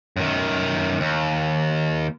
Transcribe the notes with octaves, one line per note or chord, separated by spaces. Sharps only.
F#2 D#3
D#2